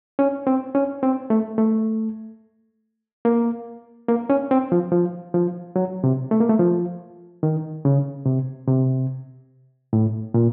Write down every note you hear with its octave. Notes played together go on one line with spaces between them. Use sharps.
C#4
C4
C#4
C4
A3
A3
A#3
A#3
C#4
C4
F3
F3
F3
F#3
C3
A3
A#3
A3
F3
D#3
C#3
C3
C3
A2
A#2